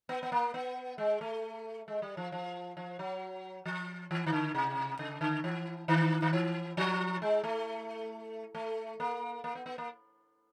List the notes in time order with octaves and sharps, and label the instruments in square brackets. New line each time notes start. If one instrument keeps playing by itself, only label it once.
[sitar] B3
B3
A#3
B3
G#3
A3
G#3
G3
F3
F3
F3
F#3
F3
E3
D#3
D3
C3
C#3
D3
E3
D#3
D#3
E3
F3
G#3
A3
A3
A#3
A#3
B3
B3
A#3